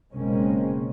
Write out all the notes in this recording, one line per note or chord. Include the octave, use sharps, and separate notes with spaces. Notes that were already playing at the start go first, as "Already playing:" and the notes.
F#1 B2 G#3 A#3 C4 C#4